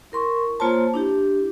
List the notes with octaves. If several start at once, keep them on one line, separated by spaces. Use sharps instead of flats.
E4 A#4 C6 C#6
A#3 F4 C5 C#5 A5 C6
D4 E4 G4